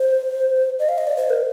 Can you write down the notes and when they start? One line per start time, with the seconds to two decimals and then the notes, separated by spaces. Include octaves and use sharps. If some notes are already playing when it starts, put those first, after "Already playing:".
Already playing: C5
0.79 D#5
0.89 F5
0.98 D#5
1.07 D5
1.17 C5
1.30 A#4